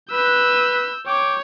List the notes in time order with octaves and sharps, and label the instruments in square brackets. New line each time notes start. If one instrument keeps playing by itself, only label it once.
[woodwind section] B4 [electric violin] E6 G6
[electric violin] C#5 [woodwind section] G5 D6